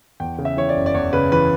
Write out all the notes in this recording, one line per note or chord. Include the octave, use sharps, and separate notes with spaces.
E2 G5
C#3
E5
E3 C#5
D5
F#1
D5
E2 C#5
C#3 B4
E3 B4